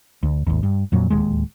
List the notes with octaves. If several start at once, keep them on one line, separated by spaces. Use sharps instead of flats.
D2
G#1 D#2
G2
F2 A#2 F#3
D1 D#2 G#3